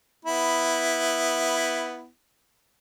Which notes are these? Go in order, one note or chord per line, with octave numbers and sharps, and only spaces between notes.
B3 E4